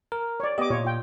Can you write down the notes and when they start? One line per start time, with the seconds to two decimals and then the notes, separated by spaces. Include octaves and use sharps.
0.12 A#4
0.40 C#5 D5
0.58 B3 G4 D#5 D6
0.70 A#2 F4 C#5
0.84 F4 G5